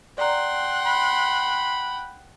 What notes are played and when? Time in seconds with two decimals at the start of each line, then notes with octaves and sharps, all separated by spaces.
0.18 D5 F#5 G5 A#5 C6
0.87 B5